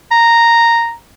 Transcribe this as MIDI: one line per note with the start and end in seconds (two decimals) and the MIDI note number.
0.11 0.94 82